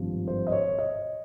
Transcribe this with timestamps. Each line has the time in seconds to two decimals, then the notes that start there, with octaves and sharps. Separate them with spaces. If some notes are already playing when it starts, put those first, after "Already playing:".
Already playing: G#1 G2 F3
0.28 C5
0.47 D#5
0.52 C#5
0.79 D#5